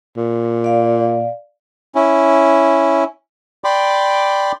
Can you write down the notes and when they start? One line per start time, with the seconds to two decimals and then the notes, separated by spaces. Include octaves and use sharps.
0.17 A#2
0.64 D5 F5
1.95 C#4 E4
3.64 D5 G5 B5 C6 D6